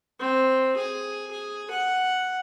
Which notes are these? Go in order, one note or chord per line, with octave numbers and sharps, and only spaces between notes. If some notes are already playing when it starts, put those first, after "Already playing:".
C4
G#4
G#4
F#5